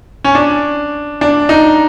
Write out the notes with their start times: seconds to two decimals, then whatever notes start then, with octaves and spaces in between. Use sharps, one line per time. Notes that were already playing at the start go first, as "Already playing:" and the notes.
0.25 C#4
0.35 D4
1.21 D4
1.49 D#4